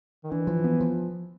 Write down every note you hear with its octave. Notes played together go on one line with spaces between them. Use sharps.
D#3
E3 D4
F3
B3
F3